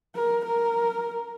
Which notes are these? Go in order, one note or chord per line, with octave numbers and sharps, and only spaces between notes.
A#4
A#4